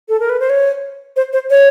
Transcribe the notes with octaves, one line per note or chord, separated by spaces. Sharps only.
A4
A#4
B4
C5
C#5
C5
C5
C#5